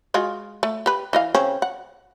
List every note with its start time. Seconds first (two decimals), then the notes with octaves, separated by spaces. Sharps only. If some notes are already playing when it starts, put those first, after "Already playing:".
0.14 G#3 F4 F#4
0.63 A3
0.86 G4 B4
1.13 E3 D#5 F5
1.35 C#3 C4 C#4
1.62 F#5